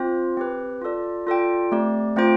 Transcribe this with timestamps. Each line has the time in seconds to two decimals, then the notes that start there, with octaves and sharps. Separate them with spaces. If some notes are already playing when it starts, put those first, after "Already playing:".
Already playing: C4 F4 C5
0.37 C4 G4 B4
0.81 F4 A4 D5
1.27 F4 A4 D5 G5
1.72 A3 C4 G4 D5
2.16 A3 C4 F4 C5 G5